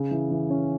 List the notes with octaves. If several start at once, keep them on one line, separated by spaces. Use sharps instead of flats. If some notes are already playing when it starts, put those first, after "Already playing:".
Already playing: C#3
E3
E3
C#4